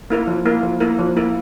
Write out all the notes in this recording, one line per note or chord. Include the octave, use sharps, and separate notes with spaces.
A#3 E4 A#4
F3
A#3 E4 A#4
F3
A#3 E4 A#4
F3
A#3 E4 A#4